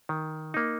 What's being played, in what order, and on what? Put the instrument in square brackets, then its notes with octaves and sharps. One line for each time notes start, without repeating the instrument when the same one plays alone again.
[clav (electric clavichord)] D#3
A#3 D#4